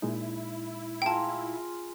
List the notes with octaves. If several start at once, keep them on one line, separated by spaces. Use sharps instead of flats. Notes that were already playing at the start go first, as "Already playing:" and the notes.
A#2 G#3 D#4 E4
F4 G#4 G5 A5 A#5